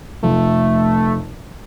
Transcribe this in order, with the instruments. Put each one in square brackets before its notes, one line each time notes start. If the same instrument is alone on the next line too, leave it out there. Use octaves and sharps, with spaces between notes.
[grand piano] F1 F4 [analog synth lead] A3